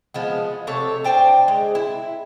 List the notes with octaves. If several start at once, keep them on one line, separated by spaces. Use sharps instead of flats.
F3 G#3 B3
C3 A3 C#5 A5
D4 C5 G5 A5
G#3
E4